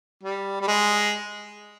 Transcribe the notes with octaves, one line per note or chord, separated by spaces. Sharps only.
G3
G3
G#3